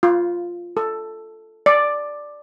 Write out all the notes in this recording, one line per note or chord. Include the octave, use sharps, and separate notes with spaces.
F4
A4
D5